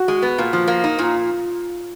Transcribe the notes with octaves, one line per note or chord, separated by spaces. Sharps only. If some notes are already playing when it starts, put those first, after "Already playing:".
Already playing: F#4
G#3
B3
A#2
F3
A#3
D#4
A#2 F4